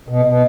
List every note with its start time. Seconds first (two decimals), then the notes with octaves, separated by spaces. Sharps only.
0.09 B2
0.25 B2